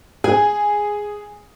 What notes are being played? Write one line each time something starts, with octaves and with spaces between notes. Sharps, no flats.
G#4 G#5